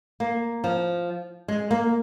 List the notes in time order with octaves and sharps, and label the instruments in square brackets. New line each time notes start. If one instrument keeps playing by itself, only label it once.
[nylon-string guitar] A#3
F3
G#3
A#3